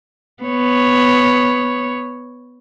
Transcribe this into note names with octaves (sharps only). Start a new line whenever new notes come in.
B3 C#5